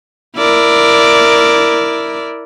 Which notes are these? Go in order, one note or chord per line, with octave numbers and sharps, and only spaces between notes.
E4 A#4 D5